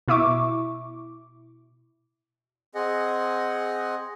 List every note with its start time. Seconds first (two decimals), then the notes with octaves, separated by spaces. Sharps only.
0.08 B2 E4 E5 C#6 D6
2.75 C4 G#4 D#5 F#5